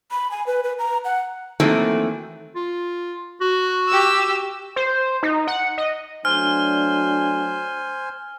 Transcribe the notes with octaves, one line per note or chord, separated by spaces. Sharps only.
B5
G#5
B4
B4
A#5
F#5
D#3 E3 F#3 A3 A#3 C4
F4
F#4
G4 E6
C5
D#4
F#5
D#5
F#3 A3 D4 C5 G#5 F6